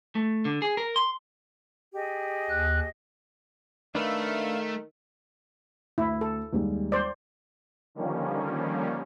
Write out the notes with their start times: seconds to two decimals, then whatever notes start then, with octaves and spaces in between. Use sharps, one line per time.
0.15 A3
0.45 D3
0.62 G#4
0.77 A#4
0.96 C6
1.94 G4 G#4 D#5
2.50 D#2 F#6
3.95 D#3 A3 D4 B4 E5 F5
5.98 D2 E4
6.21 A4
6.53 D#2 G3 G#3
6.92 C5 D5
7.95 D3 D#3 F3 G3 A#3 C#4